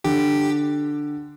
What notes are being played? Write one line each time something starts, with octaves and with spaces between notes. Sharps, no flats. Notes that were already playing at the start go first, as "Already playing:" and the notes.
D3 G4